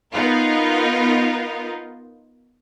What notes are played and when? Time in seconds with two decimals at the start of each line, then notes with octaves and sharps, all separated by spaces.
0.12 B3 D#4 F4 A#4